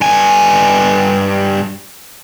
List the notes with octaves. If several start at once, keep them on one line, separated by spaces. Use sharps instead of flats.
G2 G#5